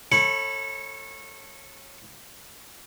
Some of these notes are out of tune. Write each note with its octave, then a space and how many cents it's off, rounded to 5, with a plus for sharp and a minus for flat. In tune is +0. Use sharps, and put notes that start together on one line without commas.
A4 +20 C#5 -25 B5 +0